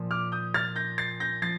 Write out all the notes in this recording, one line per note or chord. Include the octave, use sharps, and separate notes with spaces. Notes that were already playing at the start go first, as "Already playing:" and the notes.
Already playing: A#2 F3
D6 F6
D#6 G6
F6 A6
G6 A#6
A6 C7
G6 A#6
F3 A6 C7